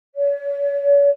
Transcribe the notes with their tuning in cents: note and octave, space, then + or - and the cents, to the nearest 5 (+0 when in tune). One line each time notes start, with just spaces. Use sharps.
C#5 +40